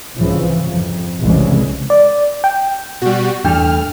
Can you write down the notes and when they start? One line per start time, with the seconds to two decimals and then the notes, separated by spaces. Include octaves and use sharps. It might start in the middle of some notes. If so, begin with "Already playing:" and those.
0.17 C2 G#2 C#3 E3 F3
0.67 F2
1.21 F1 C2 C#3 E3 G#3
1.90 D5
2.44 G5
3.02 B2 G3 F#4
3.45 E2 G2 A3 D4 A4 G5 F6